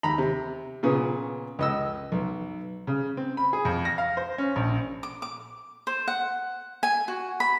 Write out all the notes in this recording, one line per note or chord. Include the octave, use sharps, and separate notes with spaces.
D#2 A#5 B5
C3
A#2 C#3 B3
C#2 D#5 E6
B1
C#3
C4
B5
G#4
F2
A#6
F5
C5
C#4
A#1
D6
D6
C5
F#5
G#5
F#4
B5